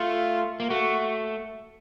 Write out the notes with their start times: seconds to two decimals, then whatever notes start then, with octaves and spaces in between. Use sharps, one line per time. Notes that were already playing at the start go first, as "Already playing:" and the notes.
Already playing: A3 F4
0.60 A#3
0.69 A3 F#4